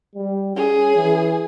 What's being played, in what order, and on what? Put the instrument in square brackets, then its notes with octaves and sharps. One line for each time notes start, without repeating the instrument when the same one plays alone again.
[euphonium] G3
[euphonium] C#4 [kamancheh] G#4
[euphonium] E3